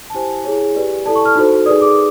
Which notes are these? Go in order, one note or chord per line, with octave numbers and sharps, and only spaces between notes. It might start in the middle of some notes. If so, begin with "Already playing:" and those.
A5
E4 G4 C5 G#5
E4 G#4 C#5
G4 B4 D5
E4 A4 D5 A5
C#6
F6
D#4 F#4 A4 C5
D#4 G#4 B4 D5 D#6
D6